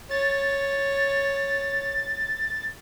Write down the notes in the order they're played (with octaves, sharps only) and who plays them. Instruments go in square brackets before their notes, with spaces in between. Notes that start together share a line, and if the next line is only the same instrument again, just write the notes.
[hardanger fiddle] C#5 [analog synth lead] A6